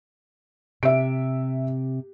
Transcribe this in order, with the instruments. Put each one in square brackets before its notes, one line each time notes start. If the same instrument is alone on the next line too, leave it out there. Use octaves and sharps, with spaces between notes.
[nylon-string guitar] C3 [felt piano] E5 D7